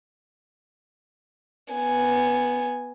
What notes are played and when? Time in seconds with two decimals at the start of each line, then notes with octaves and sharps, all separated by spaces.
1.74 B3 G#5